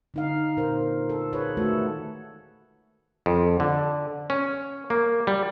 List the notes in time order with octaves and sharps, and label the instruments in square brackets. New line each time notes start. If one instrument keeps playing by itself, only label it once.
[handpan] D3 D#4 F5
A#2 A#4 C5
A4
F4 G#4 B4 C#5
D#3 G#3 A3 F#4 A4
[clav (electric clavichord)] F2
D3
C#4
A#3
G3